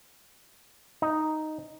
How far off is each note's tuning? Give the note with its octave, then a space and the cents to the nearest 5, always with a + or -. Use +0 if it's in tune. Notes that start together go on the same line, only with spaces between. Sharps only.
D#4 +0